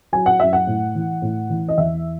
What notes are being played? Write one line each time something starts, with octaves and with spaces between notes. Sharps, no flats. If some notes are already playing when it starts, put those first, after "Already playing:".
F#3 G#5
F#5
F#2 E5
F#5
A2
E3
A2
E3
D#5
E2 E5